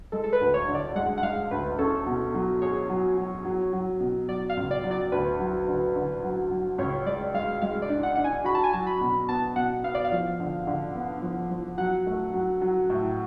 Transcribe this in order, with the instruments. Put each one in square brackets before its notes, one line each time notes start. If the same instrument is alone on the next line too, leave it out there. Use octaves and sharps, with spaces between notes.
[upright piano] G#3 [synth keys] A4
[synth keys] A4
B4
[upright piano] D2
[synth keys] C#5
[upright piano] D3
[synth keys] D5
[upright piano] G#3 [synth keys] F#5
[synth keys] F#5
[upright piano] G#3 [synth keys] F5
[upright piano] D2 [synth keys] B4
[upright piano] C#4 [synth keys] A4
[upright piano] B2
F#3
[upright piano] G#4 [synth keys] C#5
[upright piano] F#3
F#3
F#3
F#3
B2
[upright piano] F#3 [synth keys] D5
[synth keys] F5
[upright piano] C#2
[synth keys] D5
[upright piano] F#3
[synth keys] D5
[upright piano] D2 [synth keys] B4
[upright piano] F#3
D3
D3
F#3
F#3
[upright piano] C#2 [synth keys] C#5
[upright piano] G#3 [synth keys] D5
[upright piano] G#3 [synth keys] F5
[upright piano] G#3 [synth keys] F5
[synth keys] D5
[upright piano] D4
[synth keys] F#5
[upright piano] D4 [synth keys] F#5
[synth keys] G#5
[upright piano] F#4 [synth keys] B5
[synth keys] A5
G#5
[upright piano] F#3 [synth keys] A5
[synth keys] B5
[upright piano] B2
[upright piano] B3 [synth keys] A5
[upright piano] B2 [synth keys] F#5
[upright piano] B3 [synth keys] F5
[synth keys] D5
F5
[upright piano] F3
D3
D3
B3
F3
F3
[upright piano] F#3 [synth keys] F#5
[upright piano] A3
F#3
F#3
A2